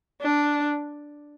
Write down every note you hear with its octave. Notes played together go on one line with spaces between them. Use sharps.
D4